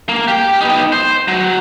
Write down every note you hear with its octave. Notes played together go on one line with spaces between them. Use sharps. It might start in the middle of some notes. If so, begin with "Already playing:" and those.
A#3
G4 G5
B3 D#4
C5
F#3